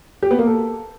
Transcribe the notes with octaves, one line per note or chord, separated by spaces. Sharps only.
G4
B3
A#3
A4